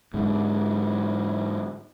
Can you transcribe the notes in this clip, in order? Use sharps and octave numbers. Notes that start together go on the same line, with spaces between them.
G#2 D3